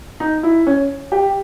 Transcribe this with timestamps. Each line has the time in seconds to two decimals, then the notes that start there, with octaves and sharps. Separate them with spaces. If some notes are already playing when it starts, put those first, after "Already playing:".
0.20 D#4
0.43 E4
0.67 C#4
1.12 G4